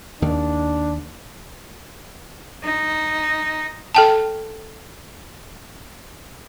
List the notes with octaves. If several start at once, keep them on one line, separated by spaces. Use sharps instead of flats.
D#2 D#3 D4
D#4
A4 G5 A5